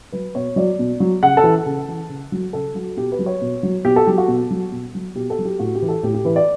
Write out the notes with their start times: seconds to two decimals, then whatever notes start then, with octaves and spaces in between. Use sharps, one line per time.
0.12 F#3 B4
0.35 B2 C#5
0.56 F#3 D5
0.79 B2
1.00 F#3
1.23 C#3 F#5
1.37 A4
1.44 E3
1.66 C#3
1.88 E3
2.09 C#3
2.32 F#3
2.53 C#3 A4
2.75 F#3 F#4
2.97 B2 G4
3.12 B4
3.19 F#3
3.26 C#5
3.41 B2
3.63 F#3
3.84 B2 G4
3.96 A4
4.07 F#3 G4
4.18 F#4
4.28 B2
4.50 F#3
4.72 B2
4.95 F#3
5.15 B2 G4
5.30 A4
5.39 F#3
5.45 G4
5.59 A2 F#4
5.75 G4
5.82 E3
5.88 A4
6.03 A2 G4
6.14 G4
6.25 E3 B4
6.36 D5